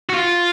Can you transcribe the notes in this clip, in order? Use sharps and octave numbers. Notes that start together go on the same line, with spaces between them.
F#4
F4